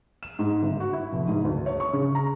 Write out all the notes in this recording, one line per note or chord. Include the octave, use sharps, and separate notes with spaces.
E7
G#2
G1
F#4
E4
F1
G#2
D2
C#5
C#6
C#3
A#5